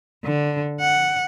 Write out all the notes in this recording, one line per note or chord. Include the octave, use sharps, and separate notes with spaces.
D3
F#5